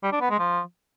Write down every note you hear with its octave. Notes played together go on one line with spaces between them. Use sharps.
G3
D4
B3
G#3
F3